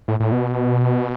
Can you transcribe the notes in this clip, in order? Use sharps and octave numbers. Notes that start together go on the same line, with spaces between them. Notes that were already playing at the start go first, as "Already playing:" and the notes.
A2
A2
B2